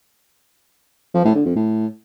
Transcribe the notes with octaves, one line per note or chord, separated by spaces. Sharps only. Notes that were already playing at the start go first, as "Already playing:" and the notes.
F3
A2
D3
F2
A2